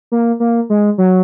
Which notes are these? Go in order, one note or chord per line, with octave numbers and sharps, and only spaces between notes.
A#3
A#3
G#3
F#3